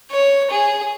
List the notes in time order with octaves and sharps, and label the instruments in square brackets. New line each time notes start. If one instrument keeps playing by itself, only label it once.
[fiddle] C#5
G#4